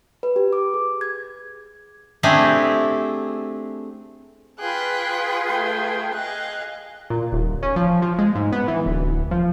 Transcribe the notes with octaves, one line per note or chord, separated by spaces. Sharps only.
B4
G4
D6
G#4
G#6
A3 C4 D4 E4 G4 G#4
F4 G#4 B4 G5 F#6
A3 G5
G#4 D#5 F5 F#6
A#2
D#1
C#4
F3
F3
G#3
G#2
B3
E3
D1
F3